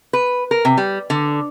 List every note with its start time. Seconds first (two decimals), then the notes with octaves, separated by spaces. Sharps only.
0.13 B4
0.51 A#4
0.65 C3
0.77 G3
1.10 D3